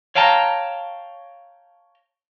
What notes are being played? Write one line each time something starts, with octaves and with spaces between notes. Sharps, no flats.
C#5 F5 G5 A5 A#5